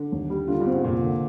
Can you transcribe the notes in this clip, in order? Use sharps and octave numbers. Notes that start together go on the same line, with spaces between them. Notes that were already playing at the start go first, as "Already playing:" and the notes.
Already playing: D3
D#2
G3
D3 F4
G2
C4
G#2
F1 A#2
D3